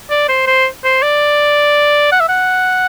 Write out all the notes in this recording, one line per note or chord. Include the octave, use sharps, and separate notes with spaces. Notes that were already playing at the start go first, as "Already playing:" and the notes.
D5
C5
C5
C5
D5
F#5
E5
F#5